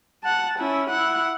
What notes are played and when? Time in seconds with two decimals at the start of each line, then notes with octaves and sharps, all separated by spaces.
0.24 F#5 A5
0.59 C#4 E4
0.90 E4 F#5